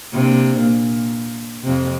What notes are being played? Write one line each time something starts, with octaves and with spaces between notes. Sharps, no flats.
C3 A#3 D4
A#2
F2 C3